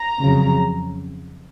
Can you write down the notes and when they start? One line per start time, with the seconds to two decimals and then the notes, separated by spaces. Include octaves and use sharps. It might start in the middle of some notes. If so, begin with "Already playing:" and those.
Already playing: A#5
0.21 F2 C#3 F#3